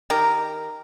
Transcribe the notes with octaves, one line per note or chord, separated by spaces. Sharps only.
D#3 G4 A#4